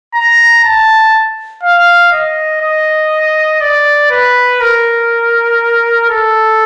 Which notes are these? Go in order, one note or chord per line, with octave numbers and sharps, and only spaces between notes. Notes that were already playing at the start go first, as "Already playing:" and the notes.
A#5
A5
F5
D#5
D#5
D5
B4
A#4
A4